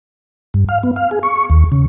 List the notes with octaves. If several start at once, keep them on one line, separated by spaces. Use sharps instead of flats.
G2
F5
B3
F5
G#4
C#6
D#2
C#3